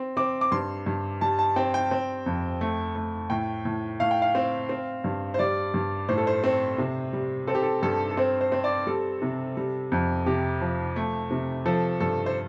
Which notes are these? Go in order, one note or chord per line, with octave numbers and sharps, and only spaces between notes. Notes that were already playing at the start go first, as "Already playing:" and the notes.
Already playing: C4
C4 D6
D6
G2 C6
G2
G3 A5
A5
C4 G5
G5
C4
F2
A3
A3
A2 G5
A2
A2 F5
G5
F5
C4
C4
G2
C5
G3 D5
G2
A2 C5
A4
C5
C4
C3
G3
C4 A4
G4
A4
G2 A4
A4
C4 C5
C5
C4
D5
G3 A4
C3
G3
F2
C3 G4
F3
A3
C3
F3 A4
G2 A4
C5